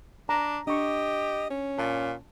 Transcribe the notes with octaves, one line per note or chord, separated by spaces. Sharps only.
D4 A#5
D4 G4 D#5 C#6
C#4
A#2 A5